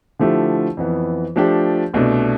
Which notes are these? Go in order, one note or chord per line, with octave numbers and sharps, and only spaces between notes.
D3 F3 A3 E4 G4
F2 E3 B3
F3 A3 D4 G4
C2 B2 A3 D4